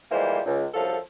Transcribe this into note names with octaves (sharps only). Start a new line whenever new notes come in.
E3 F3 G3 G#3 A#3 C5
C#2
C2 F#2 F3 F4 A4